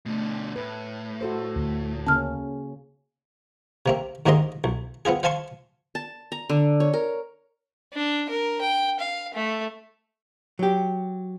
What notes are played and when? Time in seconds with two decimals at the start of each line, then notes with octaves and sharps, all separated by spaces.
0.06 B2 D3 A3
0.56 A2 B4
1.21 F#4 A4 C5
1.56 D2
2.07 C#3 A#3 C#4 A5 F6
3.86 C3 A#3 C4
4.26 D#2 G#2 A#3 C4 D#5 C6
4.64 B1
5.05 B3 C4 F4 G#4
5.23 C5 F5 G#5 A5 C6 C#6
5.95 A5
6.32 A#5
6.49 D3
6.80 C#5
6.93 A#4
7.93 D4
8.30 A#4
8.61 G5
9.00 F5
9.34 A3
10.59 F#3 G4